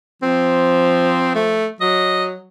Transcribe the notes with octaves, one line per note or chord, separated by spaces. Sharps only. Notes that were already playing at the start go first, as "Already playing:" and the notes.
F3 C4
A3
F#3 D#5